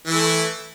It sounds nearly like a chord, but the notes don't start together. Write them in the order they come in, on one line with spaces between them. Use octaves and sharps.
E3 E4 A3